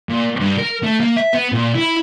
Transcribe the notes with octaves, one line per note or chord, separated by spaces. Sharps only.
A#2
G2
A#4
A3
A#3
E5
B3
A#2
E4